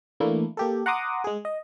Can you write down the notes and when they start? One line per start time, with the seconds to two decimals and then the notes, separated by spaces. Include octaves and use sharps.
0.20 E3 A3 A#3 D4 E4
0.57 A#3 G4 A4
0.86 F#5 A#5 C6 D6 D#6
1.24 G#3 G#4
1.45 D#5